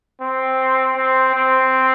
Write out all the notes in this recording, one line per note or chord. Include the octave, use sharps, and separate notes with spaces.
C4
C4
C4